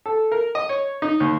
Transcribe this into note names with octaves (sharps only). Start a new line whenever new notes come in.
A4
A#4
D#5
C#5
D#4
D#2